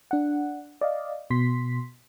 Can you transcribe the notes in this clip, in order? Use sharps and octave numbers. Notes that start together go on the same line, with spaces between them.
D4 F#5
D5 D#5 F5
B2 C6 B6